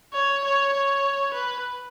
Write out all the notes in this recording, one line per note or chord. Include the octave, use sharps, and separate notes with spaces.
C#5
C#5
C#5
B4